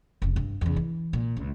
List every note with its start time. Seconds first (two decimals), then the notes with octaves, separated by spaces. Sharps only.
0.22 F1 C#3
0.36 G2
0.61 E2 C#3
0.76 E3
1.13 A#2
1.37 C#2